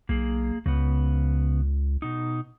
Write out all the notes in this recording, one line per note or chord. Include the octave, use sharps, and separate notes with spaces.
B1 A#3 G#4
C#2 C#3 B3
B2 D#4